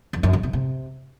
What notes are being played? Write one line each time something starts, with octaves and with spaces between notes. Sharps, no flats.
E2
F#2
C#3
C3
C3